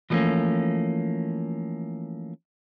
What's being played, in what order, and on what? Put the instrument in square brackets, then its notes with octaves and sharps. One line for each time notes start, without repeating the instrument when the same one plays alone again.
[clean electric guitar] E3 F3 G3 A3 A#3 C#4